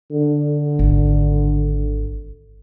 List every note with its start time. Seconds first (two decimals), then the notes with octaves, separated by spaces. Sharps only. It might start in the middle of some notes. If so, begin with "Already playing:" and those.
0.11 D3
0.79 G#1